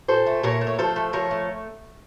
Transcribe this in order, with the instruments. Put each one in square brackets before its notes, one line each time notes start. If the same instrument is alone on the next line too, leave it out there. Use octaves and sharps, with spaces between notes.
[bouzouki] A#2 A4 C5
A3
A#2 A#4 C#5
A3
C#5
F3 A4 C5
A3
F3 A#4 C#5
A3